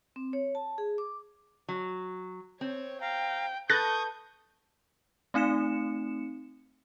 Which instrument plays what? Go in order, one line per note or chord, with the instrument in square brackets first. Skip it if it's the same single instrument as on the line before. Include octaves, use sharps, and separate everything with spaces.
[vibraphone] C4
C#5
A5
G#4
D6
[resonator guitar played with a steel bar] F#3
[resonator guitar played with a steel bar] C4 [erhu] C#5
[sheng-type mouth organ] F5 A#5 [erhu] G5
[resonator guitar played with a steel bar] A4 B4 [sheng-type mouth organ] C#6 D#6 [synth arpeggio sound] F#6 A6 A#6 [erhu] G6
[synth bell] A3 C4 D#4 C#7 E7